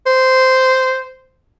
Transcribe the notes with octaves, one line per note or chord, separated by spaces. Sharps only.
C5